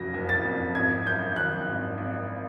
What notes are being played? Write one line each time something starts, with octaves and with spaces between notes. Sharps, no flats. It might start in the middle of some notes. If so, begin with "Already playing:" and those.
Already playing: F#1 F2 C#3 F#3 A#6
F#1
A6
F2
G#1 G#6
F#2 G6
D#3 F#6
G#1
G#1